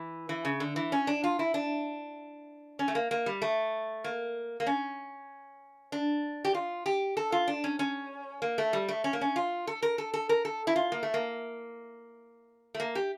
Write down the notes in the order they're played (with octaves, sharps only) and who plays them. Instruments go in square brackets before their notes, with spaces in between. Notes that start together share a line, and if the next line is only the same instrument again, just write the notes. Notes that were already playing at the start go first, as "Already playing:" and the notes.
Already playing: [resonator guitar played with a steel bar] E3
E3
C#3
D3
E3
C#4
D4
F4
E4
D4
C#4
A3
A#3
A#3
G3
A3
A#3
A#3
C#4
D4
G4
F4
G4
A4
F4
D4
C#4
C#4
A#3
A3
G3
A3
C#4
A#3
C#4
F4
A4
A#4
A4
A4
A#4
A4
E4
F4
A#3
A3
A#3
A3
A#3
G4